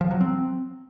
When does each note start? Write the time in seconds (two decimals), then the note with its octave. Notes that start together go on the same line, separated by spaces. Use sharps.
0.01 F3
0.11 F#3
0.21 C4